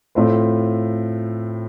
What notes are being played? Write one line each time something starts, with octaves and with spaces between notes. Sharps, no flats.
A2 A3 C4 F4 C5